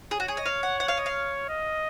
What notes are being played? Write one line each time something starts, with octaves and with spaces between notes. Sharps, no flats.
G#4 C#5
F#4
G#4
D#5
F5
F#5
F#5
F5
D#5
F5
D#5